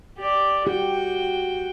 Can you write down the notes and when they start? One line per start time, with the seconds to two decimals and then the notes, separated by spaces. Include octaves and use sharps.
0.18 G4 D5
0.67 F#4 G4 G5